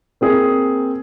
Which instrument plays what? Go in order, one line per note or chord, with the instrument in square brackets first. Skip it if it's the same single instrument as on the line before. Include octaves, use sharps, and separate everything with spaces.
[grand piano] A#3 C4 G#4